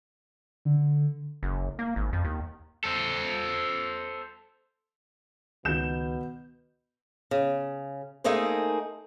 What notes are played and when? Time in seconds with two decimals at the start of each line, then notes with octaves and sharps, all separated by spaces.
0.65 D3
1.43 F#1
1.79 A#3
1.96 G#1
2.13 F2
2.25 D#2
2.84 A4 C5
5.65 C#2 B2 D#3 G6 E7
7.31 C#3
8.24 A3 A#3 D#4 G#4 C5